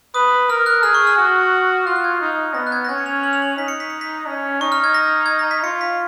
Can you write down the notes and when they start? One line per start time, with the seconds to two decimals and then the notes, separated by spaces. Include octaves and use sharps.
0.14 B4 D#6
0.50 A#4 F6
0.66 F#6
0.83 G#4 F6
0.95 C#6
1.07 F6
1.18 F#4
1.86 F4 F#6
1.96 F#6
2.04 G#6
2.21 D#4
2.54 B3 A#6
2.67 F#6
2.72 G#6
2.85 A#6
2.89 C#4 G#6
2.98 C#7
3.06 F7
3.23 F#7
3.33 F7
3.42 F#7
3.57 D#4 B6
3.68 C#7
3.80 B6
3.90 C#7
4.01 B6
4.26 C#4
4.61 D#4 C#6
4.72 F6
4.84 G#6
4.94 A#6
5.26 G#6
5.39 A#6
5.51 B6
5.63 F4 C#7
5.81 B6